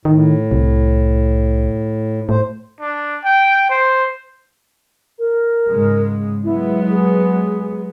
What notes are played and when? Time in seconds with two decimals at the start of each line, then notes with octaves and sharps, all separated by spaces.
0.05 A2 D#3
0.51 C2
2.29 A2 C5
2.80 D4
3.24 G5
3.70 C5
5.19 A#4
5.68 G#2 C#3 G#3
6.44 F#3 G#3 B3 E4
6.90 G#4